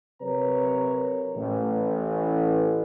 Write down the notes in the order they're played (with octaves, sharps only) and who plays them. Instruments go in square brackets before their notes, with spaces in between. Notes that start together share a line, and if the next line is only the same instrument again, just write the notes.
[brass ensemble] C3 F#3 A#4 B4 C#5 A#5
A1